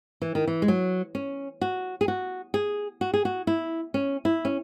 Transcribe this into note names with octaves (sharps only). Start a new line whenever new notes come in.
E3
D#3
E3
G#3
F#3
C#4
F#4
G#4
F#4
G#4
F#4
G#4
F#4
E4
C#4
E4
C#4